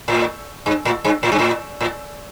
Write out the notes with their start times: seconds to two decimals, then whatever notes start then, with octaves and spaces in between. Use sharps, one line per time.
0.08 A2
0.66 G2
0.85 A2
1.05 G2
1.23 A2
1.32 G2
1.39 A2
1.81 A2